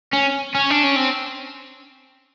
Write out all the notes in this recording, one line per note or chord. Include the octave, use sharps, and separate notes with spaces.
C#4
C#4
D4
C#4
C4